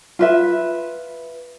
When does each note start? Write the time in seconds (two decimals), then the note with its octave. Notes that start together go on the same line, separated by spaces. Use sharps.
0.19 F4 B4 E5